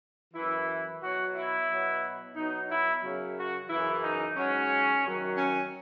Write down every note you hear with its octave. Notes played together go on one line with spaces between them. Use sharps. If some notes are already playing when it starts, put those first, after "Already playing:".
F#2 E3 E4
B2 F#3 F#4
E4
B2 F#3
B2 F#3 D#4
E4
F#2 C#3 F#3
F#4
F#2 C#3 E3 E4
D#4
G#2 F#3 C#4
F#2 D#3 F#3
C#4